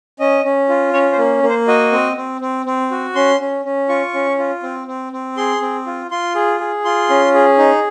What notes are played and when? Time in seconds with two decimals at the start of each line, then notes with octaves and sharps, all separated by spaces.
0.20 C#4 D#5
0.44 C#4
0.69 F4
0.93 C#4 C#5
1.12 C5
1.18 A#3
1.43 A#3
1.49 C5
1.68 F#4 D#5
1.92 C4
2.17 C4
2.41 C4
2.66 C4
2.91 F#4
3.15 C#4 C6
3.40 C#4
3.65 C#4
3.89 F4 C#6
4.14 C#4
4.39 F4
4.63 C4
4.87 C4
5.13 C4
5.37 G#4 C6
5.62 C4
5.87 F4
6.11 F4 C6
6.35 G#4
6.60 G#4
6.85 F4 C6
7.10 C#4
7.34 G#4
7.58 D#4